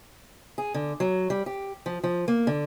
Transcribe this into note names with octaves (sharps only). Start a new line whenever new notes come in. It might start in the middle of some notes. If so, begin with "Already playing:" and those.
G#4
D3
F#3
G3
G4
F3
F3
A#3
D3